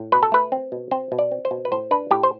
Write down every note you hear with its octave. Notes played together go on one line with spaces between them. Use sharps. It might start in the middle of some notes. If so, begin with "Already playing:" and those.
Already playing: A2
B2 B4
A4
A3 B4
C4
B2
C4 C5
B2
D5
C4
C5
B2
B4
A2 C5
D4 B4
A2 G4
C5